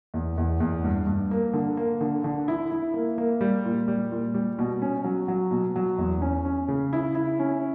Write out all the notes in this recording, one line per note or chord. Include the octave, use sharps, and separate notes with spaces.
E2
E2
E2
G2
G2
A#3
D3
A#3
D3
D3
E4
E4
A#3
A#3
G3
A#2
G3
A#2
G3
B2
C#4
F#3
F#3
B2
F#3
E2
C#4
C#4
C#3
E4
E4
C#4